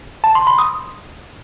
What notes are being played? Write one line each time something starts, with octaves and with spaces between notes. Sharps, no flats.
A5
C6
B5
D#6